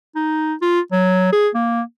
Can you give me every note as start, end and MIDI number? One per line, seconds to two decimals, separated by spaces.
0.16 0.54 63
0.62 0.80 65
0.92 1.28 54
1.33 1.48 68
1.55 1.81 58